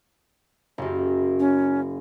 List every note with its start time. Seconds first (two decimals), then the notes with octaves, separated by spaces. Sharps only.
0.78 F#1 F#2
1.39 C#4